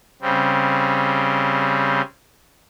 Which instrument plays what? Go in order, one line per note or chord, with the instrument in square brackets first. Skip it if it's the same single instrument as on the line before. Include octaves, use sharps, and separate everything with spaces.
[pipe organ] C#3 G3 C4